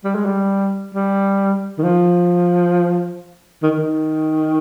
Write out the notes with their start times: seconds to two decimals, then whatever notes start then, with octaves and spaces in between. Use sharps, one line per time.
0.04 G3
0.15 G#3
0.25 G3
0.94 G3
1.78 D#3
1.84 F3
3.63 D#3
3.78 D#3